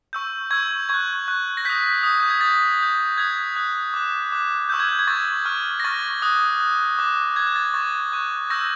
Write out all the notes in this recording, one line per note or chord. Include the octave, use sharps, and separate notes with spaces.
C#6 E6 G6
C#6 E6 G6 G#6
C#6 F#6 G#6
C#6 F#6
A#6
D#6 G6 B6
D#6 G6
G6
G#6
D#6 G6 A6
D#6 G6
D#6 F#6 G#6
D#6 F#6
D6 F#6
D6 F#6
C#6 E6 G6
G#6
G6
G#6
C#6 E6 G6 A6
C#6 F6
A#6
C#6 F6 A6
D#6 F#6
D#6 F#6
D6 F#6
D6 F#6 G#6
G#6
A6
C#6 F#6 A6
C#6 F#6
C#6 E6 G6 A#6